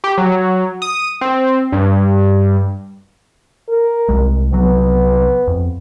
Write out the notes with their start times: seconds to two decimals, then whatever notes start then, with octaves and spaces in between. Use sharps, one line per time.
0.04 G4
0.18 F#3
0.82 D#6
1.21 C4
1.72 G2
3.69 A#4
4.09 C2 G#3
4.53 C2 F#3 B3
5.48 F2